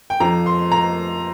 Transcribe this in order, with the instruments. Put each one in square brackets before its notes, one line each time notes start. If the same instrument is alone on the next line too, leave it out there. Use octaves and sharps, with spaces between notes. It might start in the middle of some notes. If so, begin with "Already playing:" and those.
[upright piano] G5
F2 F3 A#5
C6
A#5